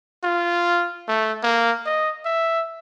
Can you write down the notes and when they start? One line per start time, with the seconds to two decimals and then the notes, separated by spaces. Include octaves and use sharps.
0.24 F4
1.08 A3
1.43 A#3
1.86 D#5
2.25 E5